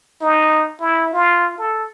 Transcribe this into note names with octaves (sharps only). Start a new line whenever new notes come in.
D#4
E4
F4
A4